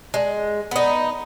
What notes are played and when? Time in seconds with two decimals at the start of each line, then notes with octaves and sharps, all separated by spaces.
0.14 G#3
0.71 B3 D#4